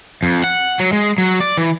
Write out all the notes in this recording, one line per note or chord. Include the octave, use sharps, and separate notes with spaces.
F2
F#5
F#3
G#3
F#3
D5
E3